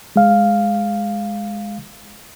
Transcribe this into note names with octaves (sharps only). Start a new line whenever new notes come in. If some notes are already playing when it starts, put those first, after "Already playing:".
G#3 F5